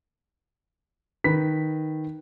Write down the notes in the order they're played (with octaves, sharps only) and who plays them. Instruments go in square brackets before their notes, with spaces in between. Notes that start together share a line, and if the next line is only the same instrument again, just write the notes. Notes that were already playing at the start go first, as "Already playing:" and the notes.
[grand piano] D#3 B4 B6